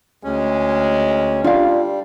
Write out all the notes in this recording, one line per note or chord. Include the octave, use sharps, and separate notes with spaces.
D2 G#3 C#4
G3 D4 F4 F5